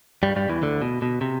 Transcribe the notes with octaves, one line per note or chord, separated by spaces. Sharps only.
G2 G3
G2 G3
E2 E3
D2 D3
B2
B2
C3